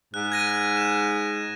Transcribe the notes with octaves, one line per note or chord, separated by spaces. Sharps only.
G#2 F#6
G#6 A#6 D#7
E7